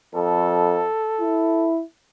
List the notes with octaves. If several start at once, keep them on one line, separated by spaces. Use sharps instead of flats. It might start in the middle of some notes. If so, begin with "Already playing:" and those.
F2 A4
E4